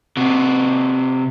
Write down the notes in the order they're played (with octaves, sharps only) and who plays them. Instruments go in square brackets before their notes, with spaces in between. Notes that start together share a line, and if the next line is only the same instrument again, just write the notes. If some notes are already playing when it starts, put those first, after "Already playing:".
[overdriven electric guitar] C3 F#4